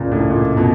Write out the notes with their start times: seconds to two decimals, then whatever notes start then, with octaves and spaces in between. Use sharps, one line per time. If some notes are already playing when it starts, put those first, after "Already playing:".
Already playing: C#2 A#2 C#3
0.12 A2
0.30 A#2
0.53 A#2
0.57 B2